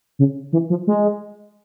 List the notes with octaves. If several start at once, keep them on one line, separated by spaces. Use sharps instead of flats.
C#3
E3
F3
G#3